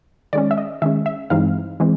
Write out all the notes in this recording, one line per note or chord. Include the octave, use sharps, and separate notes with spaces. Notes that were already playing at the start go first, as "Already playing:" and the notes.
D#3 G#3 C#4 D5
E5
D#5
D#3 G#3 C#4 E5
E5
G2 E3 G#3 C4 D#4 F5
E3 G#3 C4